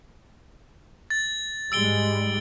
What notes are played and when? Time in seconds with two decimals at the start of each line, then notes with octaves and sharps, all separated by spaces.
1.10 A6
1.72 G#2 G3 G#3 E6 D7 G7